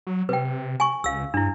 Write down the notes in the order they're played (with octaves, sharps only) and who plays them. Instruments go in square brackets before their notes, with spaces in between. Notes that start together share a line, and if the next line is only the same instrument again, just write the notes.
[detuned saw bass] F#3
[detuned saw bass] C3 [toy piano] B4 G5
[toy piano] G#5 C#6
[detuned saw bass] C#2 [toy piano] F5 E6
[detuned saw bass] G2 [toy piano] D4 E4